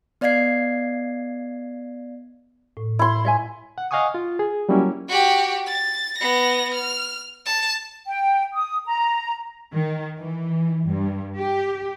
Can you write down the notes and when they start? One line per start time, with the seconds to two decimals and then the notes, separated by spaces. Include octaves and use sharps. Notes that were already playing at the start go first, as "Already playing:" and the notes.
0.21 B3 D5 D#5 F5 G#6 C7
2.77 A2
2.99 E4 C6
3.25 C#5 E5 G#5
3.78 F#5
3.91 D#5 F5 F#5 G#5 C#6 D#6
4.15 F4
4.39 G#4
4.69 F#3 G3 A#3 C#4 E4
5.08 F#4 G4
5.67 A6
6.18 B3 A#6
6.74 F6
7.46 A5
8.05 G5
8.53 D#6
8.85 A#5
9.72 D#3
10.19 E3
10.88 G2
11.37 G4